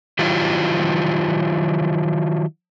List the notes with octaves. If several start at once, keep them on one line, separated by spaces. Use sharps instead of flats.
D#3 F#3 E4 F4 G4